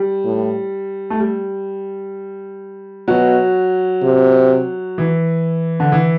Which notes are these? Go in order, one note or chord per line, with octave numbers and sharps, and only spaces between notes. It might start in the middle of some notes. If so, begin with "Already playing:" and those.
Already playing: G3
A2
A3
G3
B2 F#3
C3
E3
D3
E3